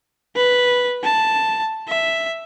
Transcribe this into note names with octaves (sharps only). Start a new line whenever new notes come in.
B4
A5
E5